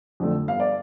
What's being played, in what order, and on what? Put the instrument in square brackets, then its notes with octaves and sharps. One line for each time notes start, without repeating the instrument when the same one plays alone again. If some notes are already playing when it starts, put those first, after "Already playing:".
[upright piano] F2 D3 A3
G1 F5
D5